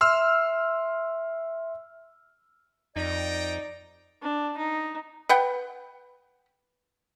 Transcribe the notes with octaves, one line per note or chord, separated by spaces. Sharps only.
E5 C6 E6 F6
F2 D#4 D5 G5 A#5
D4
D#4
B4 F#5 G5